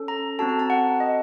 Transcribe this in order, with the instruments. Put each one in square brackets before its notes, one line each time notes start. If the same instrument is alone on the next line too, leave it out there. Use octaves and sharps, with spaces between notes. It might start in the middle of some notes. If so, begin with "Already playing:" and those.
Already playing: [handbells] C#4 A4
A#5
C4 F#4 A4 A5
A#5
A5
F#5
D#5